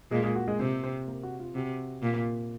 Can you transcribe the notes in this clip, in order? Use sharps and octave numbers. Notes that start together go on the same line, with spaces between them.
A#2 G#3 G#4
G#3 G#4
F#4
G#3 G#4
C3 C4 C5
C4 C5
A#3 A#4
F#4
F4
C3 F#4
A#2